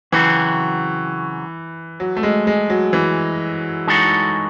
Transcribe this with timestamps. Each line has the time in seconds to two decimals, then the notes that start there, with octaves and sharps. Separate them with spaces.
0.12 C#3 E3 F#3 C4 F#4
2.00 F#3
2.17 A3
2.23 G#3
2.47 G#3
2.70 F#3
2.93 E3
3.87 G#3 D#4 F#4 A4 C#5